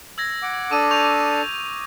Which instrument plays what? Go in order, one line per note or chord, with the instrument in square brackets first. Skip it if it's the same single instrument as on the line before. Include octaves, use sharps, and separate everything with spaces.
[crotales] E6 G#6 A#6
[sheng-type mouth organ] F#5 D6
[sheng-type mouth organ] D4 A4 [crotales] D6 D#6 D#7
[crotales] C#6 G6 F7